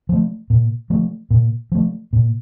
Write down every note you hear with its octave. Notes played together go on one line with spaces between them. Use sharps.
F3 A3
A#2
F3 A3
A#2
F3 A3
A#2